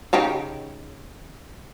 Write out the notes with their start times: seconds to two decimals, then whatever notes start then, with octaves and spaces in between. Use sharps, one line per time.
0.13 C#3 D#4 G4